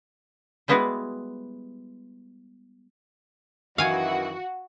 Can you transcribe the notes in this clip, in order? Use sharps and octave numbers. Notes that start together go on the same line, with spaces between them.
G3 G#3 B3 E4 F#4 G#4
F#2 D#3 E3 F#4 F5 G#5